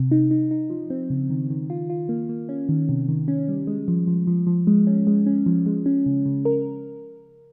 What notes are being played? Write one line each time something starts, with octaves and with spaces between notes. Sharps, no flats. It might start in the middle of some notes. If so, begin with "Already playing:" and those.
Already playing: C3
D#4
D#4
D#4
F3
C4
C#3
D#3
D#3
F4
F4
A#3
A#3
C#4
D#3
C3
D#3
C#4
G3
G#3
F3
F3
F3
F3
G#3
C#4
G#3
C#4
F3
G#3
C#4
C#3
C#3
A#4